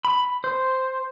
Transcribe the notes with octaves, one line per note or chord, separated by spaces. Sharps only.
B5
C5